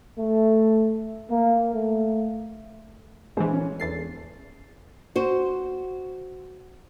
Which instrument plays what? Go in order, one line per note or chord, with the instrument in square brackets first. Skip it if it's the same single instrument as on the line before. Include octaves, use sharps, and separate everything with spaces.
[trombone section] A3
A#3
A3
[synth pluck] A#1 E3 [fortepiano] G#3 C5 G#5
[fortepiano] C#4
[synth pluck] E2 A6 C7 [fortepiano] A4
[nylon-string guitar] F#4 C5